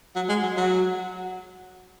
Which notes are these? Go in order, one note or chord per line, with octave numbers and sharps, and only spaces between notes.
F#3
G#3
F#3
F#3